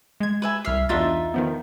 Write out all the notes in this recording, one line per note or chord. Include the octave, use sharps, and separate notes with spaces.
G#3 G#6
B4 E5 G#5
C2 E5 F6 C7
E2 D4 D#4 F4 E5 A6
D#3 F3 B3